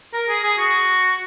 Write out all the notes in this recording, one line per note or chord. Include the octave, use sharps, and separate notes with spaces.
A#4
G#4
G#4
F#4